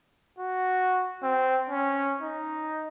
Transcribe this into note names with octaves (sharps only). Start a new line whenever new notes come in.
F#4
C4
C#4
D#4